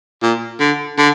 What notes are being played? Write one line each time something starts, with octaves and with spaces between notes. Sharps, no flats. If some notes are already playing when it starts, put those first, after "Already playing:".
A#2
D3
D3